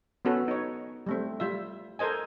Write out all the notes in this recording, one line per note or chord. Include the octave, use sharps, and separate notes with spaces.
B3 C#4 F#4 A4 B4
D#4 C#5
G3 A3 C4
G3 F4 E5
A4 A#4 C5 D#5 G#5